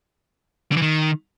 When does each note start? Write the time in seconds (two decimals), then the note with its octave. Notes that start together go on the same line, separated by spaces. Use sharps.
0.72 D3
0.77 E3
0.82 D#3